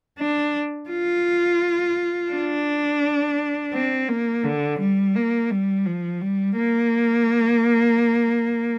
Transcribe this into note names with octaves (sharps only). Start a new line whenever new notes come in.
D4
F4
D4
C4
A#3
D3
G3
A#3
G3
F3
G3
A#3